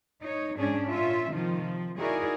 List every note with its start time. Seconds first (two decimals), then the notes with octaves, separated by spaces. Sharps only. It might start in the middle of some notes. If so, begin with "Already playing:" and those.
0.22 D#4 C#5
0.57 G#2 C#4 D4 G#4
0.89 A#2 C#4 F4 E5
1.32 C3 D#3 F3 F4
1.65 F3
1.98 D#4 E4 F#4 G#4 A#4 D5